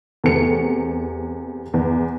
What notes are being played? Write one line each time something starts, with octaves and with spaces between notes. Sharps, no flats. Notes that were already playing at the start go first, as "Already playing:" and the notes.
E2 C3 A3 C#7
E2